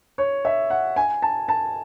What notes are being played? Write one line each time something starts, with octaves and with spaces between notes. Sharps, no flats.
C#5
E5
F#5
G#5
A5
A5